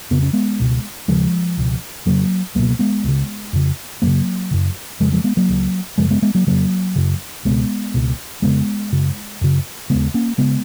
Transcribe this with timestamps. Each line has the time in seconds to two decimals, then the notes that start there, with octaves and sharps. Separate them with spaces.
0.11 F2 C#3 B3
0.22 C#4
0.33 G#3 B3
0.60 C#2 B2
1.08 D#2 C#3 F3 G#3
1.57 C#2 B2
2.06 F2 C#3 F#3 A#3
2.55 C#2 B2 F#3 A#3
2.79 G#3 B3
3.04 C#2 C#3
3.53 F2 C#3
4.02 F#2 C#3 F#3 A#3
4.51 F#2 C#3
5.00 F2 C#3 F3 G#3
5.12 F3 G#3
5.24 G#3 B3
5.37 F#3 A#3
5.49 C#2 C#3
5.98 F#2 C#3 F3 G#3
6.10 G#3 B3
6.22 G#3 B3
6.35 F#3 A#3
6.47 F2 C#3 F#3 A#3
6.95 F#2 C#3
7.45 C#2 B2 G#3 B3
7.94 C#2 B2
8.42 F2 C#3 G#3 B3
8.92 F#2 C#3
9.41 F#2 C#3
9.90 D#2 C#3 G#3 B3
10.14 A#3 C#4
10.38 C#3 G#3 B3